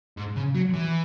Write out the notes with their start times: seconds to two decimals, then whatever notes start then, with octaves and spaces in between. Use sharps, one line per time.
0.17 G#2
0.36 C#3
0.55 F#3
0.74 E3